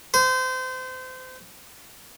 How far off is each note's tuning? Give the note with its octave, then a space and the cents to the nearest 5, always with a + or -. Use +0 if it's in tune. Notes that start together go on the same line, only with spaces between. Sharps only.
C5 -30